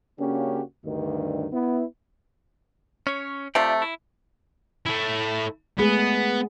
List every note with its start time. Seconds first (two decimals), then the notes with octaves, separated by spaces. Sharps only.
0.19 C#3 A#3 C#4 D4 F#4 G4
0.85 D2 G2 D#3
1.53 B3 E4
3.07 C#4 C#5
3.55 C3 A3 F4 G4 D5
3.82 E4
4.86 A3 E4
5.79 G#3 A3 B3 G#4